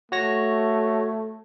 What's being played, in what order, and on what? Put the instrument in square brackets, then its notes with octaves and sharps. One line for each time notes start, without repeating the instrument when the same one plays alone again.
[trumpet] A3 [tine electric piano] F#4 C#5 A#6